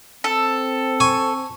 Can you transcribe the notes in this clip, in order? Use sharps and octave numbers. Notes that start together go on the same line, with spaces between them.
C4 A4
G#5 C#6